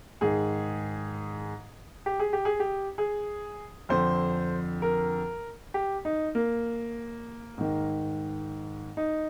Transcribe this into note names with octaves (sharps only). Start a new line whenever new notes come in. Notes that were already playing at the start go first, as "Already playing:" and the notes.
G#2 D#3 G#4
G4
G#4
G4
G#4
G4
G#4
F2 D3 C5
A#4
G4
D#4
A#3
G#2 D#3
D#4